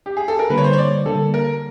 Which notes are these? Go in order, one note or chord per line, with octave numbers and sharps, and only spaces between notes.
G4
G#4
A4
A#4
D3 G3 A#3 B4
C#5
C5
C#5
D5
D3 G3 A#3 A4
A#4